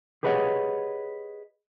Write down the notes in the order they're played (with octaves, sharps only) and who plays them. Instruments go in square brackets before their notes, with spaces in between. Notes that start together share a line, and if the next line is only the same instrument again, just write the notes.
[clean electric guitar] G4 G#4 B4 C#5 D#5 F#5